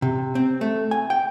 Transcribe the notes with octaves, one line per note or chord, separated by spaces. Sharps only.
C3
C4
A3
G#5
G5